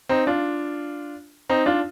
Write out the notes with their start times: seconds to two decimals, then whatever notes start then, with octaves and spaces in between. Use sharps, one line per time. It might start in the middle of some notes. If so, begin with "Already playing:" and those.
0.09 C4 D#4
0.27 D4 F4
1.49 C4 D#4
1.66 D4 F4